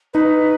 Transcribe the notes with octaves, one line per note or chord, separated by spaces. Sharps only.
D#4 B4